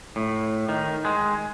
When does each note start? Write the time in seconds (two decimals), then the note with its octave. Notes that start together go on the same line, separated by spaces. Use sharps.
0.16 A2
0.69 D#3
1.05 G#3